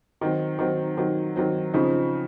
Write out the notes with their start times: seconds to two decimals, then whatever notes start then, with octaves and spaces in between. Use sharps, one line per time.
0.21 D#3 F#3 C4
0.59 D#3 F#3 C4
0.97 D#3 F#3 C4
1.36 D#3 F#3 C4
1.74 C#3 F3 C4 D#4